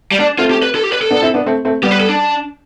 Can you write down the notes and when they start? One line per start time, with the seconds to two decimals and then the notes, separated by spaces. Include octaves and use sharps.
0.11 G3
0.20 D4
0.38 A3 C4 F4
0.51 G4
0.62 B4
0.75 A4
0.83 G4
0.92 B4
1.01 A4
1.11 B3 D4
1.22 C4 E4
1.34 B3 D4
1.46 A3 C4
1.65 A3 C4
1.83 G3 B3 G4
1.91 B4
2.00 A4
2.09 D4